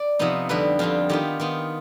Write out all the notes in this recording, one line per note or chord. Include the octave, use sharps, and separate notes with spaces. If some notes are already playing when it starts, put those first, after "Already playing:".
Already playing: D5
C3 F3 B3 D#4
F2 D3 G3 B4
F2 D3 G3 F4
D#3 B3 F4 G4
D#3 B3 F4